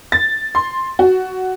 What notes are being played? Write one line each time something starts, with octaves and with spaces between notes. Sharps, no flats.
A6
C6
F#4